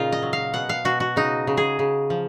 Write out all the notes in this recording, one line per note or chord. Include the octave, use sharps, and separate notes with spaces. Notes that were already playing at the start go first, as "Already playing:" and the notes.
Already playing: A#2 C#3 D#4 F4
D#5
F#3
F5
B2 F#5
F5
B2 F#4
F#4
C#3 D#4
C#3
G#4
C#3
F3